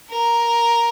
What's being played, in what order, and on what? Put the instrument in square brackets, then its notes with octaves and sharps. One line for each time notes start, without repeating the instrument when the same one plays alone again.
[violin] A#4